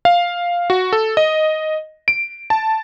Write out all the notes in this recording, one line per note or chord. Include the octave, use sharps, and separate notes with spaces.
F5
F#4
A4
D#5
D7
A5